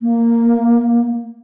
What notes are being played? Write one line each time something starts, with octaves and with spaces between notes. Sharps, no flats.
A#3